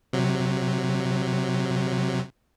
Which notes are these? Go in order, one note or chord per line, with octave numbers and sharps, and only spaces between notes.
C3 F#3